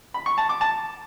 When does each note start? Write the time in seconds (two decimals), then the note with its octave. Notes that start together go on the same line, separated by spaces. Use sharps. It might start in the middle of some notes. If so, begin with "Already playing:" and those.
0.14 B5
0.26 C#6
0.38 A5
0.49 D6
0.61 A5